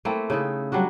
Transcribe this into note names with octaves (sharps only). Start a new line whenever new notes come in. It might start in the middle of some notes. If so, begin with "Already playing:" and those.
A3 A#3 C4 E4
C#3 D#4 E4 A4
F#3 G3 D4 F#4